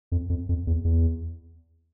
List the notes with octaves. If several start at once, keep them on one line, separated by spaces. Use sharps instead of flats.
F2
F2
F2
E2
E2